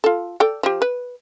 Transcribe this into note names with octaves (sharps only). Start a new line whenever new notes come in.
F4 A4
A4 D5 G5
F3 G4
B4